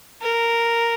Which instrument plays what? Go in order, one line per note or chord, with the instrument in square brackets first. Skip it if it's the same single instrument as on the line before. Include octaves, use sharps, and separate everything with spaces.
[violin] A#4